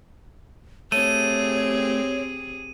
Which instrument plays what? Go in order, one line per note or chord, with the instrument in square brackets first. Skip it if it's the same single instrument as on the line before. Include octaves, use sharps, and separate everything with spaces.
[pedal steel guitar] A3 [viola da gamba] C4 G4 G#4 [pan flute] C#5 [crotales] D#7